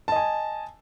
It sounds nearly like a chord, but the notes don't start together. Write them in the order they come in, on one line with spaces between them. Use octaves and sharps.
A5 D#5 G#5